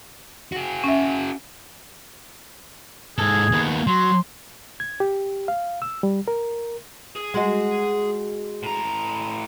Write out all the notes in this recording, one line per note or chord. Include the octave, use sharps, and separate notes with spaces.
F#4 G#4
C#4 E5
G#2 G#4 A4
D#2 B3
F#3 C6
G#6
G4
F5
E6
G3
A#4
G#4
G#3 F#4 D#5
A2 A#5